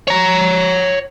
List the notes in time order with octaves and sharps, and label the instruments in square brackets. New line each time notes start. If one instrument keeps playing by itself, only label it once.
[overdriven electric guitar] C#5 A#5